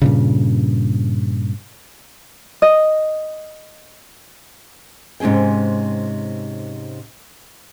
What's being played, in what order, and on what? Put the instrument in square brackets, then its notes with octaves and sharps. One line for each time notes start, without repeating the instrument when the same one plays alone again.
[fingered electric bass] G2 A#2 C#3
[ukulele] D#5
[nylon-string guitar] G#2 C3 C#4 G#4 G5